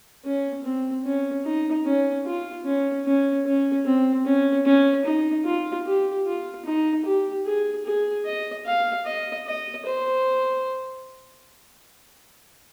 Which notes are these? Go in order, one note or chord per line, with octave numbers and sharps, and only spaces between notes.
C#4
C4
C#4
D#4
C#4
F4
C#4
C#4
C#4
C4
C#4
C#4
D#4
F4
G4
F4
D#4
G4
G#4
G#4
D#5
F5
D#5
D#5
C5